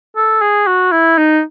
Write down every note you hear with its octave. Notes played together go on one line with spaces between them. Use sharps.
A4
G#4
F#4
E4
D#4